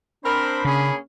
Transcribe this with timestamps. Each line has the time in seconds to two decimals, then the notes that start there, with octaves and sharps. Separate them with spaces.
0.24 C4 D4 A#4 C5 B5
0.65 C#3 A#3 C#4 G#4